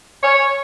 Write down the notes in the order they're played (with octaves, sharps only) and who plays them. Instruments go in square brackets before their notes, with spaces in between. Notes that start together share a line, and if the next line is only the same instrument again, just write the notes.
[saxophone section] C#5